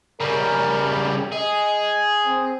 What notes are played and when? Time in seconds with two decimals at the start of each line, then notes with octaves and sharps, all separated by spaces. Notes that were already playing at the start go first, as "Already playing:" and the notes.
0.20 C#3 G3 A#4
1.32 G#4 D#5
2.26 C4